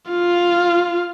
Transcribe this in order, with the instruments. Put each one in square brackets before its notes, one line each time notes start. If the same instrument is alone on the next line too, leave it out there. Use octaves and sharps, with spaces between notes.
[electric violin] F4 F5